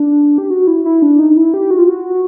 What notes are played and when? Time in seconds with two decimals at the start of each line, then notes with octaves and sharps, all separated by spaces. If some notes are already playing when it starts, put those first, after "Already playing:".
Already playing: D4
0.38 G4
0.50 F#4
0.67 E4
0.85 E4
1.02 D4
1.19 D#4
1.37 E4
1.54 G4
1.71 F#4
1.78 F4
1.87 F#4